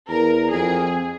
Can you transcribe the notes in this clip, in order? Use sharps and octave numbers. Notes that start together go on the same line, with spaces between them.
E2 A#4
F2 G#4